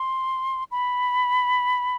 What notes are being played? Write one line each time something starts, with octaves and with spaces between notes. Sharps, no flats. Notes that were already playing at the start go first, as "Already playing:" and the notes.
Already playing: C6
B5